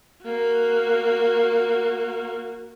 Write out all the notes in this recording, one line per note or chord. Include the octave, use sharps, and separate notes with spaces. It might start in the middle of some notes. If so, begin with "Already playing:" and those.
A#3 F#4